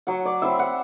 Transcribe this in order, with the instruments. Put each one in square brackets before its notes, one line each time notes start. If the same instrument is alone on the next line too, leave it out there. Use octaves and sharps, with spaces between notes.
[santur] F#3 F#5
D5
C4 E4 E5
F#5